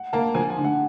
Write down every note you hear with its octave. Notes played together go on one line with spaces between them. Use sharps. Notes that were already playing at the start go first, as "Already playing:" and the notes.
Already playing: F#5
A#3 A5
F3 G#5
G#5
D3
F#5